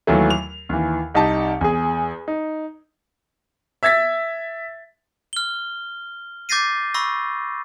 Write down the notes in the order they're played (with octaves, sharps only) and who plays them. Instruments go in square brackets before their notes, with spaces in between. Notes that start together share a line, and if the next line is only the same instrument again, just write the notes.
[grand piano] D#2 E3 F#3 A3
F7
D#2 E3
C2 D#4 G4 G5 A5
E2 G#4
D#4
[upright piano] E5 E6 G#6 A6 B6
[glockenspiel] F6 G7
D6 G6 A6 A#6 C7 D#7
B5 C#6 E6 A#6